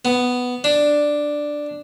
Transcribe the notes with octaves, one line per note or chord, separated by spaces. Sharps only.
B3
D4